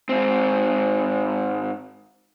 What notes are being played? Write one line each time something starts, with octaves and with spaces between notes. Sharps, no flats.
G#2 C4